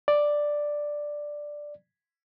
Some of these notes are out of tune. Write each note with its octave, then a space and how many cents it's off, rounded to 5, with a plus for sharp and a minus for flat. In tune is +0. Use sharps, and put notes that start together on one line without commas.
D5 +5